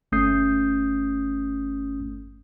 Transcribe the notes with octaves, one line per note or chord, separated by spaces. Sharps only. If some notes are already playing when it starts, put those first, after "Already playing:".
G1 A3 C#4 D#6 G6 C7